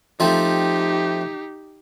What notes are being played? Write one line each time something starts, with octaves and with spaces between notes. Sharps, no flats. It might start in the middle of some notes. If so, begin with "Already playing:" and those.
F3 A3 C4 D#4 G4